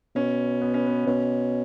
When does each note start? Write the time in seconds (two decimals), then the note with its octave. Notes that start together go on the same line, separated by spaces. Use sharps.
0.15 B2 C#4
0.61 B3
0.74 C#4
0.87 B3
1.07 B2 C#4